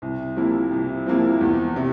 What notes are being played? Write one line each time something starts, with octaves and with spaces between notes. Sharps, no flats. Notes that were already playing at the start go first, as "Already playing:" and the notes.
C2
C3 F3 A#3 E4
C2
C3 F3 A#3 E4
E2
C3